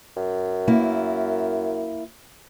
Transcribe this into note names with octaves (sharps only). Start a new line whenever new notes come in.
F#2
A#3 E4